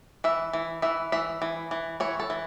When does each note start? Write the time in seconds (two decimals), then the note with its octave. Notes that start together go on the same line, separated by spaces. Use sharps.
0.24 E3 E5
0.53 E3
0.82 E3 E5
1.12 E3 E5
1.42 E3
1.71 E3
2.00 E3 C#5
2.20 A4
2.30 E3